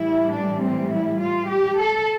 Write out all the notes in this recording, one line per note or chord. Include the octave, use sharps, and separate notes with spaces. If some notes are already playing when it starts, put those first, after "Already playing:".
Already playing: A2 E3 G3 E4
D4
C4
E4
F4
G4
A4